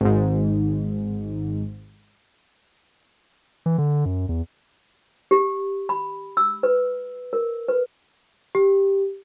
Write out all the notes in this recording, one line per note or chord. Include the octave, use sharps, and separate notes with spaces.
G#1 G#2
E3
D3
F#2
E2
G4
B5
E6
B4
A#4
B4
G4